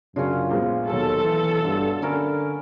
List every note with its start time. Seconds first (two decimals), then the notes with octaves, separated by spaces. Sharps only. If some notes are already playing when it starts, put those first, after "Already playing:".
0.16 F#2 C#3 C#4 D4 F4 F#4
0.51 A#1 G#3 B3
0.89 D#2 B2 F#3 A4 A5
1.24 E3
1.64 G2 D3
2.02 D3 C#4 E4 A#4